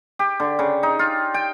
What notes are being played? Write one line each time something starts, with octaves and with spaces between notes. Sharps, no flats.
G4
D3
C#3
D#4
F4
G5